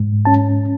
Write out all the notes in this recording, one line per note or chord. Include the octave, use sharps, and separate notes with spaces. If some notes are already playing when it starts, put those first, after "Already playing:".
Already playing: G#2
C#4 A5